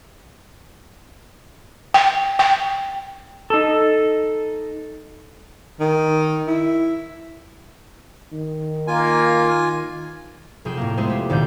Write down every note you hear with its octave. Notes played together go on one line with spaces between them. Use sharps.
G5
G5
D#4 A4
D#3
E4
D#3
A#3 F4 G#5
F1 G#4 G5 E7
A2 A#3
G#3 A3 B3 G#4 C5
G4
G#1 D2 A#2 D5 G6